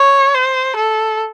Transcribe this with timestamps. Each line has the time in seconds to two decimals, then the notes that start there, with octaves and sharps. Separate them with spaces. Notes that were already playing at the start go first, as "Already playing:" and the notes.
Already playing: C#5
0.34 C5
0.76 A4